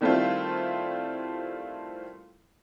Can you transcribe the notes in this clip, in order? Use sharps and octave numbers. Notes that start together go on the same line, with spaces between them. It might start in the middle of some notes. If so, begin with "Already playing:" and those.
D#3 G3 A3 C4 E4 F4